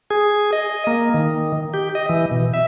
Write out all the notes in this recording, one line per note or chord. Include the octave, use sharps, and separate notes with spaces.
G#4
D#5
A#3
D#3
G4
D#5
E3
B2
E5